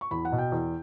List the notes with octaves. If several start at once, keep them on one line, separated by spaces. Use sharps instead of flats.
C#6
E2 B5
F#5
B2
G5
E2